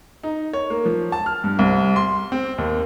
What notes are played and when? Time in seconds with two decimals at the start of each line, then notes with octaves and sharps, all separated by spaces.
0.24 D#4
0.53 C#5
0.70 A#3
0.86 F3
1.12 A5
1.26 F6
1.44 G2
1.59 C2
1.96 C6
2.32 C4
2.58 D#2